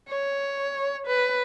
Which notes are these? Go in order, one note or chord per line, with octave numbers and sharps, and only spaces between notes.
C#5
B4